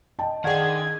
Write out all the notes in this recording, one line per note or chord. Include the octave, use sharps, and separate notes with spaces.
D#5 G5 A5
D#3 D4 G#4 D5 F5 F#5 G#6